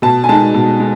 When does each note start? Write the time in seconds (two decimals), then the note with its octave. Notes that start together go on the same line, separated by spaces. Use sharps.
0.02 B2 A5
0.24 G#5
0.29 G#3 D#4 A5
0.54 B2
0.80 G#3